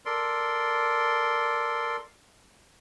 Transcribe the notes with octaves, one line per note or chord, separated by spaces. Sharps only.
A4 A#4 D5 C6